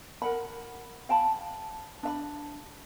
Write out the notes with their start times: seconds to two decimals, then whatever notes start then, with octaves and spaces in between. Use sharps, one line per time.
0.22 A#4 F#5 B5
1.09 F5 G5 A5 B5
2.03 D4 E5 B5